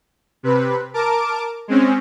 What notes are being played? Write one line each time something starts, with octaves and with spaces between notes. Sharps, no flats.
C3 B4
A#4 A5 D6 D7
G#3 C4 C#4